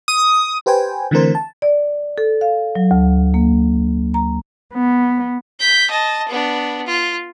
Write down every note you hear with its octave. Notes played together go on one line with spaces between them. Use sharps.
D#6
G4 B4 C5 G5 G#5
D3 E3 A3 C4 A#4 C5
A5
D5
A4
F5
F#3
D2
A#3
A#5
B3
G6 B6
D#5 A5
B3 D4
F4